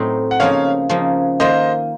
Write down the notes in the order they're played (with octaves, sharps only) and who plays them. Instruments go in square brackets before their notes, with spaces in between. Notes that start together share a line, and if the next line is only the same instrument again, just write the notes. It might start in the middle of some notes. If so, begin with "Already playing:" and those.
Already playing: [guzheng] A2 F#3 C4 D#4
[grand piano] F#5
[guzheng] C#3 F3 A#3 D#4 [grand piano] C#5 F5
[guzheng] C#3 F3 A#3 D#4
[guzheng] D#3 A#3 F4 [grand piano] C5 D#5